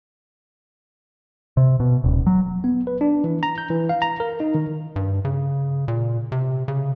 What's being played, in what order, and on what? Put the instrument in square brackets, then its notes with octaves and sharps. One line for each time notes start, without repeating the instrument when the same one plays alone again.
[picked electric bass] C3
B2
D#1
F#3
[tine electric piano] B3
B4
D4
E3
A#5
G6
E3
F5
A#5
A#4
D#4
D#3
[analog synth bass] G2
C#3
A#2
C3
C#3